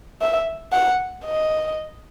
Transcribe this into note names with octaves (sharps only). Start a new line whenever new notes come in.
E5
F#5
D#5